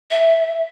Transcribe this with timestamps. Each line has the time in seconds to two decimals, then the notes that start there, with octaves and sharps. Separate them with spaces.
0.11 E5